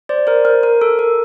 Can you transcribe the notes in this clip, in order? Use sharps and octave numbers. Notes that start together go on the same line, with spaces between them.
C5 D5
A#4 C5
A#4 C5
A#4
A4
A#4